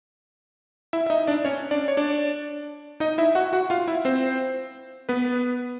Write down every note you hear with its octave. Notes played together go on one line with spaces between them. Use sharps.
E4 E5
E5
D#4 D#5
D4 D5
C#4 C#5
D4 D5
C#5
D4 D5
D#4 D#5
E4 E5
F#4 F#5
F#4 F#5
F4 F5
E4 E5
C4 C5
B3 B4